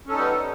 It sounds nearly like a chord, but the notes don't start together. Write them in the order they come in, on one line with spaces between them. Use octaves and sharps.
C#4 A4 D#4 G3 B3